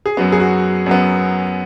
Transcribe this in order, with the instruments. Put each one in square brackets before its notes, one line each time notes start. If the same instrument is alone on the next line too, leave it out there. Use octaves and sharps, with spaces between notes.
[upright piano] G#4
F#2 F#3 B3 F#4
G#4
F#4
F#2 F#3 B3